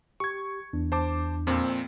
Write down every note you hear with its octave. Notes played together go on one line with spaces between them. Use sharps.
G4 C#6 G#6
E2 D4
C5 A5 D6
F2 A#2 C4